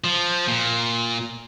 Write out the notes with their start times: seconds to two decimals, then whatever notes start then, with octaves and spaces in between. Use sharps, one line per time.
0.04 F3
0.48 A#2